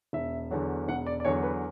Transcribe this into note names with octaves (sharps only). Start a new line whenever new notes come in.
E1 E5
E2 D3 F#3
E1 F#5
D5
D5
E2 D3 F#3 C#5
B4